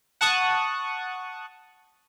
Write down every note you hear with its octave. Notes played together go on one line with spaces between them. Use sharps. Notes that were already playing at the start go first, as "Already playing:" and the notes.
F#5 A5 C#6 D#6 F#6